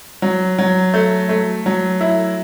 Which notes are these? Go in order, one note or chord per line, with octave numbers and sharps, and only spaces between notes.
F#3
F#3
A3
A3
F#3
E4